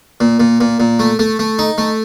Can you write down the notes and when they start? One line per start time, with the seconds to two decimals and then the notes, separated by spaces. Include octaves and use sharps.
0.20 A#2
0.40 A#2
0.61 A#2
0.80 A#2
0.99 A3
1.19 A3
1.39 A3
1.59 D#4
1.78 A3